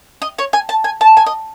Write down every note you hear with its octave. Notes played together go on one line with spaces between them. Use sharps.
D#5
C#5
G#5
A5
G#5
A5
G#5
D#5